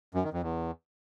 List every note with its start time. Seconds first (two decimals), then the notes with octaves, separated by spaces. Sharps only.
0.14 F#2
0.24 D#3
0.33 F2
0.43 E2